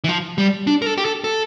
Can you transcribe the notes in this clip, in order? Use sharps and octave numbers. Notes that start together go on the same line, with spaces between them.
E3
F3
G3
D4
A#4
A4
G4
A4
A4